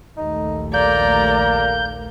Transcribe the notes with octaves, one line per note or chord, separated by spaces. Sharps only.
A#1 D#2 A3 D#4
A#3 D5 A#5 G6